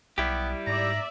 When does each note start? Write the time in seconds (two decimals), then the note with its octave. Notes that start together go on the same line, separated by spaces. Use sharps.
0.18 B1 G3 B3 E4 G4
0.67 G#2 D5 E5 A#5